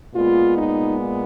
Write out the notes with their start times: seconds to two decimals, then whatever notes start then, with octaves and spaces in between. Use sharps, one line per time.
0.13 A#2 G#3 B3 F4
0.56 D#4